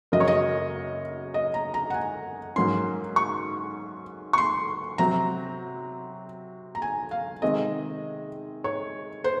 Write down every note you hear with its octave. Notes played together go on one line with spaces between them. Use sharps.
F#2 C#3 F#3 A#3 C#4 D#5
C#5
D#5
D#5
A#5
A#5
F#5
G#5
G#2 F#3 A#3 C#4 C6
C#6
C#6
C6
C3 F#3 C4 A#5
A#5
G#5
F5
C3 D#3 G#3 C4 D#5
C#5
C5